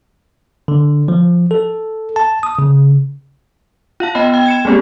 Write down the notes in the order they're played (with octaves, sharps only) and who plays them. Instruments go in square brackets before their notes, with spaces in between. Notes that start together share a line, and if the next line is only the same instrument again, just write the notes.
[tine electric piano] D3
F3
A4
A5
D#6
C#3
[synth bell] F4 F5 A5
B3 D#5 G5 B5
G5
G#6 C#7 E7
G3 G#3 A#3 C4 C#4 G4